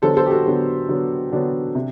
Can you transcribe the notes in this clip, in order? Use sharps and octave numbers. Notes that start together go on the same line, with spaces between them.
D3 F#3 B3 A4 C5
A4 C5
G4
F#4 A4
D3 F#3 B3
D3 F#3 B3
D3 F#3 B3 D4
C3